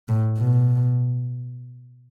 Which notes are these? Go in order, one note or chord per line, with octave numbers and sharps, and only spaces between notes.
A2
B2